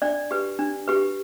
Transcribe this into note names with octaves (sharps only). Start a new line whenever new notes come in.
D4 D5
G4 B4
D4
G4 B4